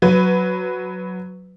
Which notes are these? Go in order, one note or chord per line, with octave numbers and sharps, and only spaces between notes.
F#3 B4